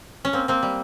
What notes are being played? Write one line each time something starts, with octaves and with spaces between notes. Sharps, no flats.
C#4
A#3 C4
A#3 C4
G3